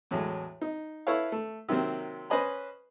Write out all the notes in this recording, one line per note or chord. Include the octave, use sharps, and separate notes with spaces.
E2 A2 F#3 G#3
D#4
E4 A4 B4 C#5 F5
A3
C3 D#3 F#3 A#3 C4
C#4 B4 C5 D#5 G#5 B5